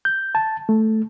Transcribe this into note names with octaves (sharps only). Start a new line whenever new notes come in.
G6
A5
A3